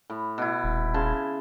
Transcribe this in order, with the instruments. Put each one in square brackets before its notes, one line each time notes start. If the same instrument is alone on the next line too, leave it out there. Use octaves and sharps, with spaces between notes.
[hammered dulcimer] A2
B2 E4
[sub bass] D#1
[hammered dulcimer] C#3 A5 C6